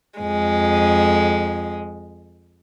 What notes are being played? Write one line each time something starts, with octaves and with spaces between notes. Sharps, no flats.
F2 G#3